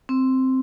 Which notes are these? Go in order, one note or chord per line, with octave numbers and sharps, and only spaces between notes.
C4